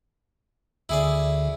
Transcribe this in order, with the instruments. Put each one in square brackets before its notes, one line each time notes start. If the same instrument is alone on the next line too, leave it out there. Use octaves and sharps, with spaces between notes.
[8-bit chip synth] D2 D3 [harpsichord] E4 G#4 D5